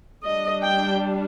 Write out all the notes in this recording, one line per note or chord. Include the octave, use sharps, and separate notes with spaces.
G3 D4 D#5
G5